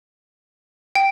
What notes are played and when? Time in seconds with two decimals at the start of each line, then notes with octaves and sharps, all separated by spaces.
0.95 G5